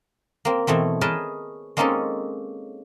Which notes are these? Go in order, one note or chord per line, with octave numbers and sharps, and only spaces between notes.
A#3 C4
B2 E3 A3 C4
G#4 A#4 B4 C#5 D#5 A5
G#3 A#3 C4 C#4 D#4 A4